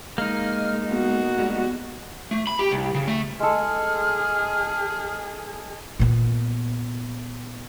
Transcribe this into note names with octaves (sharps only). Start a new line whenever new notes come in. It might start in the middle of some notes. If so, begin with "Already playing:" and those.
G#3 A#3 D#4 F6
B3 F#4
G3 G#3
A3
B5
G4
C2
C#3
A3
G#3 G#4 A4 F6
A#2 B3